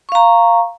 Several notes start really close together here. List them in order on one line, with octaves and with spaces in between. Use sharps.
C#6 F5 A#5